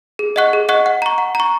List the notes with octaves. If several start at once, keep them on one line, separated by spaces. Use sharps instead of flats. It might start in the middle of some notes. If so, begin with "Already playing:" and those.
G#4
D#5 F#5 C#6 F#6
G#4
D#5 F#5 C#6 F#6
F#5
A#5 C#6
F#5
A#5 C#6